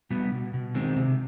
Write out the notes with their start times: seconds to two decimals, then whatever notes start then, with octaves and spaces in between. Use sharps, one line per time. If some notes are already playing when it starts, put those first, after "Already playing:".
0.10 B2 G3 B3
0.32 B2
0.54 B2
0.75 D#3 G#3 C4
0.96 C3